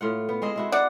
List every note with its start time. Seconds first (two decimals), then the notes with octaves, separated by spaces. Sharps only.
0.01 A2 F4 F#5
0.29 B3
0.42 G#3 C4 D#5
0.56 G#3 E4 F#4
0.72 D5 F#5